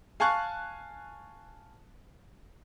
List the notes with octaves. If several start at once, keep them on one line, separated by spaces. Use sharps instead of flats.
F5 G#5 A5 C#6 F#6